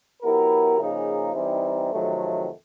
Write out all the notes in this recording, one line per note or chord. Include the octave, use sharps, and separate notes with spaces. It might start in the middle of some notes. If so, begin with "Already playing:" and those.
F#3 B3 E4 G4 A#4
C#3 F3 A#3 D#4 G#4
E3 G3 C4 D#4
F2 C3 D#3 F#3 A3